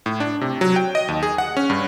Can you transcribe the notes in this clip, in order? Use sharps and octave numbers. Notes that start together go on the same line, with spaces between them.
A2
D4
C3
F#3
G5
D#5
D#2
G#4
F#5
C#4
G2